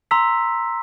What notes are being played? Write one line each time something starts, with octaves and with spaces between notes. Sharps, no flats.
A#5 C6 E6 B6